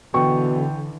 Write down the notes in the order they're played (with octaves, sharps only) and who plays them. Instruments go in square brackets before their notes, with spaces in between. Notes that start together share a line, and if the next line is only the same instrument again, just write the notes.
[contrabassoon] B2 [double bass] D3 E3 [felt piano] G5 C#6